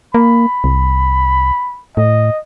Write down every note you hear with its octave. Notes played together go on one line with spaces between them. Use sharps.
A#3 B5
C2
A2 D#5